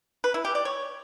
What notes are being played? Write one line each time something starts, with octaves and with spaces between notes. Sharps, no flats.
B4
E4
G4
D5
C#5